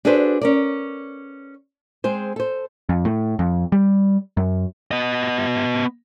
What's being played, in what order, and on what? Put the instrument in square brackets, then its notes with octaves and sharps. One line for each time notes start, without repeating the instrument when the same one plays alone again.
[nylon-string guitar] D4 F#4 G#4 A4 B4 C5
C#4 A#4 D5
G#3 C4 G#4 C5
A4 C5
[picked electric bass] F2
A2
F2
G3
F#2
[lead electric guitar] B3 D#5